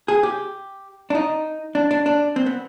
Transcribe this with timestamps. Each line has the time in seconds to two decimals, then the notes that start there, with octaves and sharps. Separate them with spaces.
0.08 G#4
0.23 G4
1.10 D4
1.15 D#4
1.75 D4
1.91 D4
2.06 D4
2.36 C4
2.46 B3